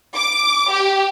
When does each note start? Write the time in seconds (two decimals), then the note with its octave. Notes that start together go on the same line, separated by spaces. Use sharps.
0.15 D6
0.71 G4